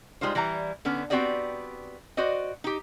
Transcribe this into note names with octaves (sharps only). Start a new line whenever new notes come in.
G3 G#3 D#4 F4 C5
E3 G3 E4 A#5
D3 B3 C#4
B3 C4 F#4 G4 D5 D#5
F#4 C5 D5 D#5
D#4 G4